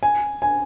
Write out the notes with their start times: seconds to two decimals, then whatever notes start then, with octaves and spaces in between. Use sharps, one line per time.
0.03 G#5
0.42 G#5